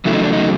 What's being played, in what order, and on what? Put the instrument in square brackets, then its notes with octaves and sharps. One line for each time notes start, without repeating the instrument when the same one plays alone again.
[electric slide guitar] E2 C#3 F#3 A3 E4
D#4
D4
D#4